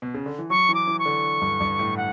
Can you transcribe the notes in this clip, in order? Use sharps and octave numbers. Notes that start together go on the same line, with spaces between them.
B2
C#3
D3
E3
F#3 C#6
E3
D6
E3
C#6
D3
G2
G2
A2
F#5